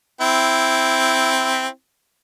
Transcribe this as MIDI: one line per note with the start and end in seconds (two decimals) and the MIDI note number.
0.21 1.67 60
0.21 1.67 64